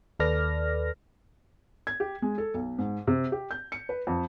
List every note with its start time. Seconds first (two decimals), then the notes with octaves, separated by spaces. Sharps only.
0.20 D#2 A4 B4 D5 F6 A#6
1.87 G#6
2.00 G4
2.22 G#3
2.38 A4
2.54 B1
2.79 G#2
3.07 C3
3.32 G4
3.51 G6
3.72 C#7
3.89 B4
4.07 F2